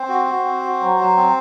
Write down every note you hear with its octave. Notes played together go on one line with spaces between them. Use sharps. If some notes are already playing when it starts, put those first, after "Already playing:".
Already playing: C4 C5
F#4
F#4
C4
F#4
F#3
F#3
C4